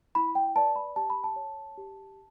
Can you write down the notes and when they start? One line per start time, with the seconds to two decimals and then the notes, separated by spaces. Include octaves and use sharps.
0.15 E4 B5
0.35 G5
0.55 B4 D5 A5
0.76 B5
0.96 G4 A5
1.10 B5
1.24 A5
1.36 C#5
1.78 G4